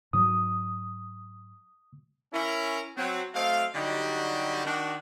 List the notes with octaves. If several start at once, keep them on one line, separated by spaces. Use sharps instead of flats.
G#2 F#3 D#6
C#4 E4 A#4
F#3 C4
F#3 A3 C4 D#5 F5
D3 F#3 G3 D#4 F#4 G4
D#3 D4 F#4